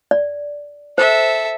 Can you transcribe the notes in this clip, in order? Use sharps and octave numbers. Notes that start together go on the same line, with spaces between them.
D5
A4 C5 E5